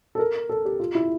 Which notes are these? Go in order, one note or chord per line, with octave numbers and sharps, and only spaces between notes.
A4
A#4
A4
G4
F4
E4